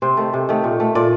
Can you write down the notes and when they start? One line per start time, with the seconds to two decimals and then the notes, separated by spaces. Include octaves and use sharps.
0.02 C3 C5
0.17 D#3 A3
0.33 C3
0.49 D#3 A3
0.64 A#2
0.80 A3
0.95 A#2 D5